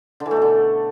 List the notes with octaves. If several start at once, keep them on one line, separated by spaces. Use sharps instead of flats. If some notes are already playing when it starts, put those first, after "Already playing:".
D3
E3
A3
B2
D3